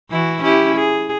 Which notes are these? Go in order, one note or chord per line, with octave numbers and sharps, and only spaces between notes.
E3 E4 F#4
C#4 E4 G4
G#4